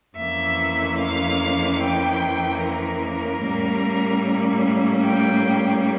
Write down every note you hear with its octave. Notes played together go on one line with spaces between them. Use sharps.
F2 E3 A#3 C#4 E5
F5
G5
A#4
A2 G3 A#3 C#4
G5